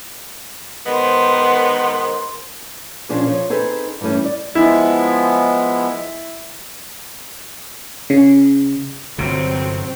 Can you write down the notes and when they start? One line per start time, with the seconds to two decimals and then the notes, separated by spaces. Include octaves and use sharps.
0.87 D#3 G#3 B3 A#4 C5 C6
3.09 A#2 F3 C#4 D4 G#4
3.27 F3 C#5
3.50 C4 D#4 G#4 A4 B4
4.01 G2 E3 G3 A3 C#4
4.25 D5
4.55 F3 G#3 B3 E4
8.10 C#3
9.18 G1 C3 F#3 C4